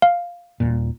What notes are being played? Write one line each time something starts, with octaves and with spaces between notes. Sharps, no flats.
F5
D#1 A#2